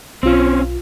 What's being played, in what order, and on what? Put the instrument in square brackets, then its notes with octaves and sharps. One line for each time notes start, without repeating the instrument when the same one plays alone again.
[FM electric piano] B1 F4 [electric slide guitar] C4 C#4